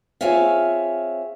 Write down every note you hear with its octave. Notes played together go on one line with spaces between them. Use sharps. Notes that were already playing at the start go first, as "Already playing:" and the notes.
C4 F4 G#4 C#5 E5 F5